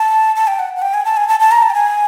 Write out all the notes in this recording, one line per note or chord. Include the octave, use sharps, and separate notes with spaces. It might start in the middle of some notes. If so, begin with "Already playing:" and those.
Already playing: A5
A5
G5
F#5
F#5
G5
G#5
A5
G#5
A5
A5
A#5
A5
G5
G#5